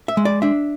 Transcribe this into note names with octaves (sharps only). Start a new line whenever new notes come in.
E5
G#3
D5
D4 E5